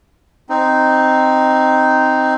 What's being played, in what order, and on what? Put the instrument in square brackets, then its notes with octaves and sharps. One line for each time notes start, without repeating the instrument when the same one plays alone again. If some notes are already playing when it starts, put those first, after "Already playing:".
[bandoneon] C4 D#4